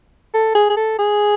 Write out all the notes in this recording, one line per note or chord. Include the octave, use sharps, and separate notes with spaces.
A4
G#4
G#4
A4
G#4